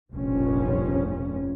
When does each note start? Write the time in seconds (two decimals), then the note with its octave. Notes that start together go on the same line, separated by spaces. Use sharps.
0.13 F1 A#1 G2 F3 C#4